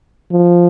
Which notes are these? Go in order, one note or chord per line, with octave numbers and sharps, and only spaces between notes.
F3